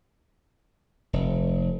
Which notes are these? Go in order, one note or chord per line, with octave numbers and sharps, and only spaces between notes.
F1